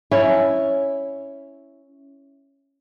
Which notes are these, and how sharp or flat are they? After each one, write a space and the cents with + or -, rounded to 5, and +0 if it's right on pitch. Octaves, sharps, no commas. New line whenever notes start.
C#4 +0 E4 +0